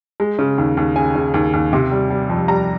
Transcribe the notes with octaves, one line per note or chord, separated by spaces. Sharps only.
G#3
C#3
D#2
D#2
C#3 G#5
C#3
D#2
D#2
C3
G3
G3
F2
G3 A#5